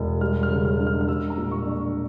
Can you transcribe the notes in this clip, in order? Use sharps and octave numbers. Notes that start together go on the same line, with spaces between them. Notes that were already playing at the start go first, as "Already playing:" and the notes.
Already playing: E1
G3 F6
F6
C#3
F6
D4
F6
F6
G3 E6
A#5
A#2
C#6
D4